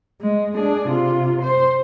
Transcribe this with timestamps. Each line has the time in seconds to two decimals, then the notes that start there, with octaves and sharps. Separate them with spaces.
0.21 G#3
0.54 D4 G#4
0.88 C3 F4
1.42 C5